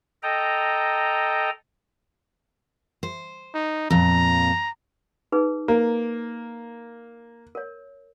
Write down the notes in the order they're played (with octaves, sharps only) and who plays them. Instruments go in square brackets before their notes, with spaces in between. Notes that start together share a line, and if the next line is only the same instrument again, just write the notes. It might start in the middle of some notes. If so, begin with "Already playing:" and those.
[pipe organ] A4 D#5 G5 A#5
[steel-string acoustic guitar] C5
[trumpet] D#4
[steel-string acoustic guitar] F2 A#2 [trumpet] A#5
[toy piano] D#4 G#4 B4
[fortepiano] A#3 [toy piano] A#5
[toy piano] A#4 C#5